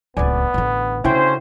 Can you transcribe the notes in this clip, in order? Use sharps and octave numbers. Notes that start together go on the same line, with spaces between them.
D1 C#2 B3 D5 G#5
A1 D3
D2 C#3 C#4 E4 C5 G5